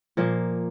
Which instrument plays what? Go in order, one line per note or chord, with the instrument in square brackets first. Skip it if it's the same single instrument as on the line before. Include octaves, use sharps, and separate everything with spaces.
[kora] A#2 F3 A#3